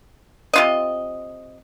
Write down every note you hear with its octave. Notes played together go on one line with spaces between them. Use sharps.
C3 F4 D#5